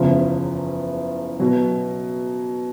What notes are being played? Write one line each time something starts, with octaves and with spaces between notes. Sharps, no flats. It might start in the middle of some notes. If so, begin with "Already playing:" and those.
Already playing: F#1 E2 C#3 F3
B2 F#3